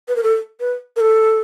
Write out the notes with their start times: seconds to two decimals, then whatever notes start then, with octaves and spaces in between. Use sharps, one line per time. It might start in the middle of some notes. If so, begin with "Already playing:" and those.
0.08 B4
0.16 A#4
0.23 A4
0.60 B4
0.96 A#4
1.00 A4